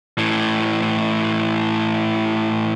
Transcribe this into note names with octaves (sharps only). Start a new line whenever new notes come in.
A2 E3